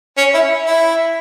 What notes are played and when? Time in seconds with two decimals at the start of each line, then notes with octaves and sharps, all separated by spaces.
0.18 C#4
0.34 E4
0.66 E4